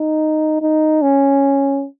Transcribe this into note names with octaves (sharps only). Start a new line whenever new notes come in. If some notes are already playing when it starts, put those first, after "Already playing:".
Already playing: D#4
D#4
C#4